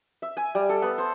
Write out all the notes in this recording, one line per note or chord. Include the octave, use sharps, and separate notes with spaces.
E5
G#5
G3
A4
B3
C5